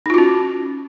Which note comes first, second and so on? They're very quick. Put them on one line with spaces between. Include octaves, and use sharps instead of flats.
D#4 F4 F#4 C#4